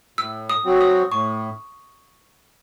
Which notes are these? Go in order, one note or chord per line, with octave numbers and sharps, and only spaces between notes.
A2 E6
D#6
F#3 C4 F#4
D#6
A2 C#6